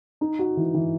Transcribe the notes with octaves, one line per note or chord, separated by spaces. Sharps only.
D#4
F#4
E3
E3